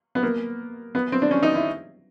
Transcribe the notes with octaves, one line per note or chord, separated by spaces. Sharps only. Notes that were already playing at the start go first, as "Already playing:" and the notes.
B3
A#3
B3
C4
D4
C#4
D#4
E4